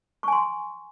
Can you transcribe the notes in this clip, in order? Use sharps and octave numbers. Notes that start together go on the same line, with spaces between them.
G#5 C6 C#6